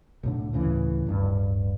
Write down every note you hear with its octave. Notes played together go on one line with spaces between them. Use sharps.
B1 A2 D3
D2 A2 C#3 E3
D1 G2